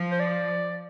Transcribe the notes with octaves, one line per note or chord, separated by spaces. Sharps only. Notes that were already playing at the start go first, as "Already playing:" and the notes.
Already playing: F3
C5
D5